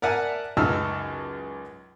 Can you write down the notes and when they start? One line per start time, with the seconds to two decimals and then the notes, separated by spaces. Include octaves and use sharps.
0.02 A#4 D5 E5 F#5 G#5 A5
0.57 C#2 F#2 D#4 A5 E6 F6